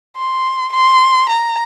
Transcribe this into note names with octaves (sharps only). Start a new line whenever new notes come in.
C6
C6
A#5